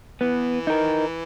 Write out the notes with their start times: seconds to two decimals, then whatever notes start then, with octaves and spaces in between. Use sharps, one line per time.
0.21 E3 B3
0.67 D#4 A#4